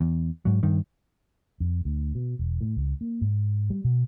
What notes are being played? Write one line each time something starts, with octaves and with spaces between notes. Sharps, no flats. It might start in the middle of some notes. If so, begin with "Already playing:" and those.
E2
G#2 F#3
G2 D#3
F2
D2
B2
E1
A2
C#2
A#3
G#2
G3
B2